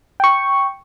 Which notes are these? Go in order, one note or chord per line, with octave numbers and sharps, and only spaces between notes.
G5 C#6